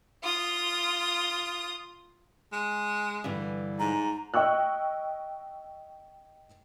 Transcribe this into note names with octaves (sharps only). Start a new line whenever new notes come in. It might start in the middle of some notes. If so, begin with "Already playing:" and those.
F4 D#6
G#3
G2 D3 E3
G#2 A#5
D#5 G5 C#6 E6 F#6